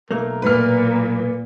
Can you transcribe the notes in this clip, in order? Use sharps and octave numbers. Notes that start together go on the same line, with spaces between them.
B1 A3 A#3 A#4
A#2 B4 F6